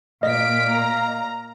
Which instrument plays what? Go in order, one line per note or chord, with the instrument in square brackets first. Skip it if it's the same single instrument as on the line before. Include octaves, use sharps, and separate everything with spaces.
[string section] A#2 [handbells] D#5 [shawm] F5 [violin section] B6 D7
[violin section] A#5